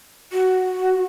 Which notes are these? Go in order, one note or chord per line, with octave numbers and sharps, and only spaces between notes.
F#4